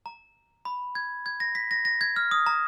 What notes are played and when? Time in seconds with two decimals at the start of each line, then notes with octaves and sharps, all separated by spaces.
0.06 A#5
0.65 B5
0.95 G#6
1.26 G#6
1.40 A#6
1.55 B6
1.71 A#6
1.85 A#6
2.01 G#6
2.16 F6
2.31 D#6
2.46 A#5